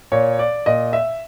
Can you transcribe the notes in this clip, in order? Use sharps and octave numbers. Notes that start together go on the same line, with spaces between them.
A#2 C#5
D5
A#2 D#5
E5